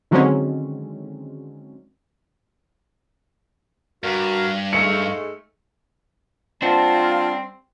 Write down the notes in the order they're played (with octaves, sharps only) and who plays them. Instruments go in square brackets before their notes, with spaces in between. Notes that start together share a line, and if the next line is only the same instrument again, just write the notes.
[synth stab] D3 D#3 F#3 G#3 C4 C#4
[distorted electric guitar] G2 [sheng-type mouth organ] F#4 A#4 F6
[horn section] G#2 G#3 A3 [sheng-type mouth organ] F5 C#6 [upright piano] C#7
[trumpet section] G3 C4 [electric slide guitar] D4 C5 F#5 [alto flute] F4 [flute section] A5